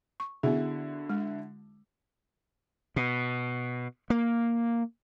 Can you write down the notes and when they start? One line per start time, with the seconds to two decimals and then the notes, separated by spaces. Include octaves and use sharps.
0.20 C#6
0.43 D3 B3 E4 F#4 G#4
1.10 G#3
2.96 B2
4.10 A#3